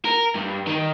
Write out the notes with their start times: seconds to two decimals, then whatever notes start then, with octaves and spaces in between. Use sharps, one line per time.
0.05 A#4
0.35 G2
0.67 D#3